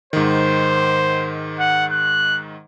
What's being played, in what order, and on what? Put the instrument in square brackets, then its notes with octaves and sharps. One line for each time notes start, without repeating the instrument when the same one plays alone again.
[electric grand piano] G#2 D#3 [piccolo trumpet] C5
[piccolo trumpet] F#5
F#6